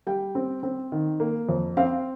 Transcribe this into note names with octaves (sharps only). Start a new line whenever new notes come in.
G3 G5
C4
C4
D#3
A#3
F2
C4 F5